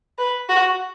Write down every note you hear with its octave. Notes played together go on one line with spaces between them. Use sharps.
B4
F#4